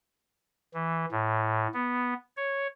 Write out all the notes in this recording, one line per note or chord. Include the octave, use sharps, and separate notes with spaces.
E3
A2
B3
C#5